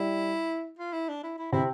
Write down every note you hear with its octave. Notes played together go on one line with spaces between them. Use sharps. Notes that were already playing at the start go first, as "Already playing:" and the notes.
Already playing: G3 E4
F4
E4
D4
E4
E4
C3 C4 E4